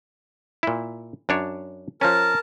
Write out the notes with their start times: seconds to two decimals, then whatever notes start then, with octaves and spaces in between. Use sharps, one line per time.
0.63 A#2 E4
1.29 F#2 D4 C#5
2.01 F3 C#4 A#4 A5